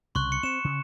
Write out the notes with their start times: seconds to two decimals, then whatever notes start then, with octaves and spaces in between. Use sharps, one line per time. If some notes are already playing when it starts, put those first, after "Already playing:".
0.15 C2 C#3 C6 C#6 F#6
0.32 C#7
0.43 C4 C#7 E7
0.65 C#3